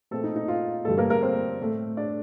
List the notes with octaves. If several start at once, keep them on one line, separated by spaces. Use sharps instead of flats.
A#2 A3 C4 A4
D#4
D#4
F4
G2 D3 G3 A3 A4
A#3 A#4
A#3 A#4
C4 C5
A2 A3 C4
D4 D5